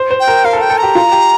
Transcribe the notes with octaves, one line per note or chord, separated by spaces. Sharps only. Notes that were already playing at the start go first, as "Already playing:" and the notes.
Already playing: C5
C5
G5
A#4
A#4 F5
A4
A#4 G5
A4
G4 A#5
F4
G4